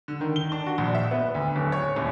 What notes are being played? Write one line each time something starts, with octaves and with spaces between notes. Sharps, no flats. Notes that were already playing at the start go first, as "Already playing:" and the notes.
D3
D#3
G7
D4
F#4
A#1
E5
B3
D2
D1
C#5
D#1